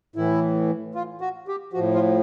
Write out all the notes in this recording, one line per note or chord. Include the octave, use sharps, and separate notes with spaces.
A2 E3 E4
F4
F#4
G4
A2 F3 F#4
F4